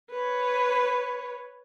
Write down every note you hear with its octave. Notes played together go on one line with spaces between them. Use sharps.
B4 C#5